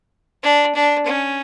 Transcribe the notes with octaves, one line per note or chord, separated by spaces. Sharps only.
D4
D4
C#4